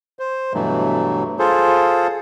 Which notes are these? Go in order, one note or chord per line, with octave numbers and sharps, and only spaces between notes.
C5
G2 B2 E3 F#3 A3
F4 G#4 A4 C5